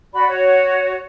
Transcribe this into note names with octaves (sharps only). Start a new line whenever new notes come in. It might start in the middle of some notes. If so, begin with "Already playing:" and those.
F#4 D5 B5
F#4 C#5